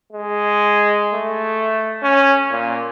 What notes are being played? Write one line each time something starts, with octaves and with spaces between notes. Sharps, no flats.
G#3
A3
C#4
A#2